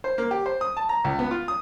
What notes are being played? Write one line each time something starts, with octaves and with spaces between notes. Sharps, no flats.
C5
A#3
G4
C5
D#6
A5
A#5
C#2
B3
F4
D#6